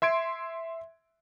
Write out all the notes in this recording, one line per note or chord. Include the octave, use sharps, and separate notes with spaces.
E5 C6 G#6 D7